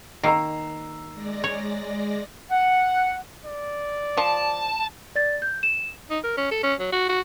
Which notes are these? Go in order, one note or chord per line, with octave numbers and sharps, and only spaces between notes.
D#3 A#3 A#5 E6 C7
G#3 D5 A#6
C#5
F#5
D5
F3 A5
D5 A6
G6
E7
D#4
A#4
C#4
A4
C#4
F#3
F#4
F#4